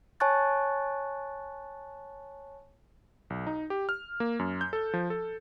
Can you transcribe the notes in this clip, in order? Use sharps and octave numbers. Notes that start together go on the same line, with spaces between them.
C#5 G#5 A5 C#6 F#6 A6
B1
D#4
G4
F6
A#3
F#2
G6
A4
F3
A4